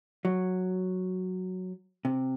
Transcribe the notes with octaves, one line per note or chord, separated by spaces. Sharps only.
F#3
C3